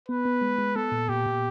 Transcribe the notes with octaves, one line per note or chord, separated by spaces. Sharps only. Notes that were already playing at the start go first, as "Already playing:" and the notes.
B3 B4
B3
G#3
G#3
B3 A4
A#2
A#2 G4
A#2